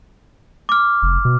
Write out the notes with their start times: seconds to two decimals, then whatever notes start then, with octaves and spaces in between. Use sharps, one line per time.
0.69 D6 F6
1.02 F1
1.25 B2